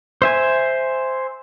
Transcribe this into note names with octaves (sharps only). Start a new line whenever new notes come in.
C5 E5 G#5